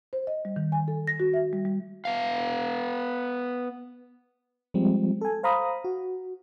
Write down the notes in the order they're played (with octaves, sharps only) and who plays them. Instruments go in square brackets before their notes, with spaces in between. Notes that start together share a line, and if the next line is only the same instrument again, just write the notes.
[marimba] C5
D#5
G3
D#3
G#5
A4
A#6
F#4
E5
G3
G3
[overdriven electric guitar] B3 F5
[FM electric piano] F3 G3 G#3 C4
A4 G#5
C5 F5 A#5 B5 D#6
F#4